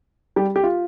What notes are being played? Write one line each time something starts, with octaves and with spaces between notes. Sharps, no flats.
G3 G4
G4
F4